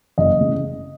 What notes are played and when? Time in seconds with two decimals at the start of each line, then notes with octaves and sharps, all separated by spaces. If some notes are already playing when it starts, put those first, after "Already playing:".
0.18 F#1 D#5
0.41 C#3